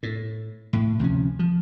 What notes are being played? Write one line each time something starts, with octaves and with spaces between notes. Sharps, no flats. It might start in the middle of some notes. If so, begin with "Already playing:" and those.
A2
A2
D2 C3 F3 C#4
F3